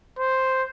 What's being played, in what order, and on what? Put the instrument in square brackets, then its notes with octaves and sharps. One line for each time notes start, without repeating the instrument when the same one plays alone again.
[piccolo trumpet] C5